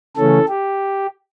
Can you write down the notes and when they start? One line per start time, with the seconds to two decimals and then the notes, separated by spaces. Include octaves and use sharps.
0.17 C#3 E3 A3 C#4 A4
0.48 G4